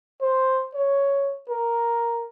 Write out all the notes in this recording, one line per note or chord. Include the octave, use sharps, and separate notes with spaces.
C5
C#5
A#4